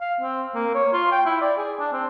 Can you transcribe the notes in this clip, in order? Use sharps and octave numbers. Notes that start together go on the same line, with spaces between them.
F5
C4
A#3
C#5
F4
G5
E4
D5
G#4
D4
C4